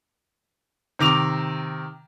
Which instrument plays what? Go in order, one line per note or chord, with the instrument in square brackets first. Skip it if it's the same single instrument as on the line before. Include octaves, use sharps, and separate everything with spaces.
[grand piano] C3 D#3 D6 F7